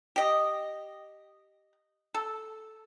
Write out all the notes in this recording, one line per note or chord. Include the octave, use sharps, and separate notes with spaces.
G4 D#5
A4